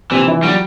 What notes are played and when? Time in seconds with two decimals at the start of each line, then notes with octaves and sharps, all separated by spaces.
0.11 C3 E3 C4
0.27 E3 E4
0.43 F#3 G3 F#4